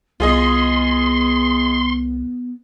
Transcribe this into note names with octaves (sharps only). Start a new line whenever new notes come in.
C2 B3 F4 G#4 D#5 C6